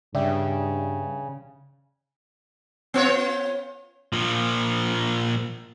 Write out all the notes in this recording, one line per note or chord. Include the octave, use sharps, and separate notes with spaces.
G2 C#3 D5 E5 G5
B3 F4 C#5
A#2 F3